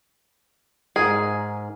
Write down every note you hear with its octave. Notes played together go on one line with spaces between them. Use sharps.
G#2 G#4 A#4